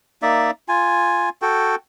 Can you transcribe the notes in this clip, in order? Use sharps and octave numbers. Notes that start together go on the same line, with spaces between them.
A#3 D#4 D5 E5
F4 G#5
F#4 A4 G5